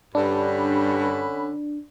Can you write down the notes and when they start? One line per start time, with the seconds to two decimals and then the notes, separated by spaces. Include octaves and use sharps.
0.15 G2 D3 C#4 D4 B5